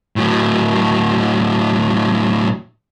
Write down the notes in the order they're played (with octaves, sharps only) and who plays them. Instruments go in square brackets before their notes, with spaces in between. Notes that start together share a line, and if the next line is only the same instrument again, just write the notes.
[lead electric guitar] A2 F#3